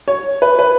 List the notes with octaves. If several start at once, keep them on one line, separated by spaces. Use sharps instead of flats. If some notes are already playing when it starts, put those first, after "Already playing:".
C#5
B4
B4